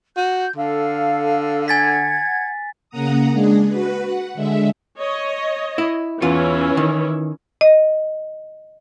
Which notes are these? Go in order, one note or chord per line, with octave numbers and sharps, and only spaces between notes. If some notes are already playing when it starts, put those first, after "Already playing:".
F#4 G6
D3 A4 F5
F#5 G#5 G#6 A6 B6
C#3 A#3 F#5 A#5 D#6
G#3 D4 G#4
F#4 B4
F#5
D3 G#3 E5
C#5 D#5
E4
E2 E3 C#4 E4 F4
D#3
D#5